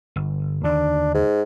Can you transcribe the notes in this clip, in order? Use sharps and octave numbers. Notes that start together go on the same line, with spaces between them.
G1
D#2 D3 D#3 D4
G#2